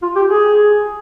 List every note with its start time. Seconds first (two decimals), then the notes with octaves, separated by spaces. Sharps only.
0.02 F4
0.15 G4
0.30 G#4